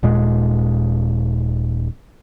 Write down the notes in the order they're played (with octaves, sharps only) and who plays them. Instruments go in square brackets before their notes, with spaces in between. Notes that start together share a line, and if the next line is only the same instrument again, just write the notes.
[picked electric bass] D#1 A#2 G#3